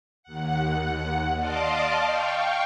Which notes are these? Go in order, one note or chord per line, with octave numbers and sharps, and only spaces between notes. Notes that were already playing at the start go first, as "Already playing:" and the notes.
D#2 F#5
D5 D#5 F5 A5 C6 D6
F5 G5 C#6